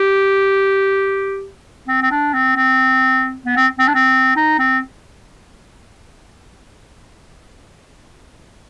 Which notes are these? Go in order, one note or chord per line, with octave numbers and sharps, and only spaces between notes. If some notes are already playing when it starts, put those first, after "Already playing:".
Already playing: G4
C4
C4
D4
C4
C4
B3
C4
C4
D4
C4
D#4
C4